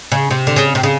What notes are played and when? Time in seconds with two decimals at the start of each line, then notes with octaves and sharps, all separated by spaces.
0.12 C#3
0.31 C3
0.47 D3
0.56 C#3
0.75 C3
0.83 C#3